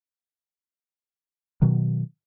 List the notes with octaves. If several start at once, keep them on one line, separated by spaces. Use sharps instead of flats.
B2 D#3 F#3